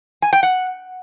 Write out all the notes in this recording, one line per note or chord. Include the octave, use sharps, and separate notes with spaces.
G#5
G5
F#5